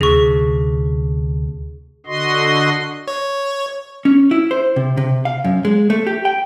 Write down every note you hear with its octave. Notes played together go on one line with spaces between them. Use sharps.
D2 C3 G#4 C#6
D3 F#4 D#5 C6
C#5
C#4
E4
C5
C3
C3
F5
F#2
G#3
A3
G4
G5